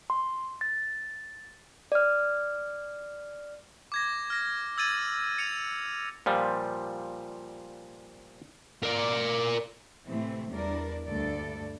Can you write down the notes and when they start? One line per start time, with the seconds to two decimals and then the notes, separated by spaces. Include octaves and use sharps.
0.10 C6
0.61 A6
1.92 D5 F6
3.92 D6 G#6 A#6
4.30 F6 A#6
4.78 E6 G#6 A6 D#7 F#7
5.38 C#7 D#7 F7
6.26 A#2 F3 G3
8.84 A#4 D5
10.06 A2 C3 E3 A3 C4
10.51 E2 G3 D4 A#4 D5
11.07 D2 G2 A4 D5